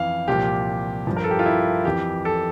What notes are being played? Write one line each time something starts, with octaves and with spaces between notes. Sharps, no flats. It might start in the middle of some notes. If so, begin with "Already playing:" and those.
Already playing: F2 E3 F5
C2 A#2 F3 G4
G2 F3
A#4
A4
G4
F4
E4
F2 E3 G4
A4